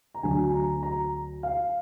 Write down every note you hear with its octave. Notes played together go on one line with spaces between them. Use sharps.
A#5
D2 D3 F#3 G#5
A#5
A#5
F5